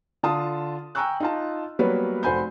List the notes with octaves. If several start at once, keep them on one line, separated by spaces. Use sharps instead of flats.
D3 F4 A5 D#6
G5 G#5 A#5 C#6 E6 F#6
D#4 F4 A5
F#3 G3 A#3 B3 B4 C#5
F1 F#4 C5 G#5 B5 G6